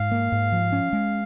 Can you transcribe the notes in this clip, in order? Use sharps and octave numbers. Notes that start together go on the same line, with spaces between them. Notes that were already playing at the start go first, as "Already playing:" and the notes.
Already playing: G#2 F5
A#3
G#2
F3
C#4
G#3